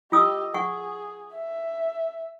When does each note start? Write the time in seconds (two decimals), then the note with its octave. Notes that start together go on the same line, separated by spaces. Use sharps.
0.12 F4 G4 D#5 D#6 E6
0.54 G#4 F#5 C#6
1.33 E5